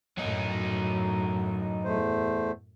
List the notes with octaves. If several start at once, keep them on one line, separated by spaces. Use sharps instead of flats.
F#2 A2 F#3 D#4
E2 A3 C5